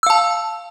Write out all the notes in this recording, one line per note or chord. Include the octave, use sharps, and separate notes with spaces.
F5 A5 E6